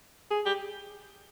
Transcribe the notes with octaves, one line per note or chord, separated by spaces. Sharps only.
G#4
G4